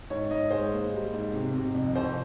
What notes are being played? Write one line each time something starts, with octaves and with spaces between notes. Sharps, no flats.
G#2 C#5
G#2 D#5
G#3 C5
A#3
G3
G#2
C3
C3
F2
C2 C5